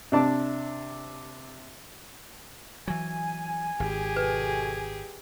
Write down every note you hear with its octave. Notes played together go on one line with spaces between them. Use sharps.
C3 D4 A5 D6
E3 F#3 G#5
G#1 G4 G#4
B2 A4 B4 G#5